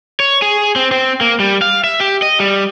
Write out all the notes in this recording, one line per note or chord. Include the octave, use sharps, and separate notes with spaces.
C#5
G#4
C4
C4
A#3
G3
F5
E5
G4
D#5
G3